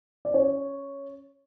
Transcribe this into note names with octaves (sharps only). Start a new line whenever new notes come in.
D5
C#4 C#5